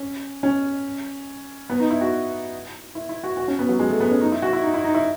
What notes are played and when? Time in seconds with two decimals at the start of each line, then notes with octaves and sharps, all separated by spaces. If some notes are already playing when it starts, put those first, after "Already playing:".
Already playing: C#4
0.43 C#4
1.70 B3
1.80 D#4
1.90 E4
2.01 F#4
2.95 E4
3.09 E4
3.23 F#4
3.37 F#4
3.48 C#4
3.59 B3
3.69 F#3
3.79 G#3
3.90 A3
4.00 B3
4.11 C#4
4.21 D#4
4.32 E4
4.42 F#4
4.53 E4
4.63 D#4
4.74 E4
4.84 D#4
4.95 E4